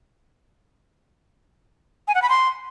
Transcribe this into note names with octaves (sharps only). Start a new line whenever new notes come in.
G#5
F#5
B5
C6